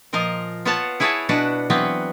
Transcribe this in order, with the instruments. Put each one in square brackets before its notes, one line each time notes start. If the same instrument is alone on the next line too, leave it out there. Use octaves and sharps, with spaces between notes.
[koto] A#2 F3 A#4 D#5 F5
B3 F4 C#5 F5 F#5 A5
E4 G#4 B4 C#5 F#5 A5
B2 D4 F#4 B4 F#5 A5
E3 F#3 B3 C4 B4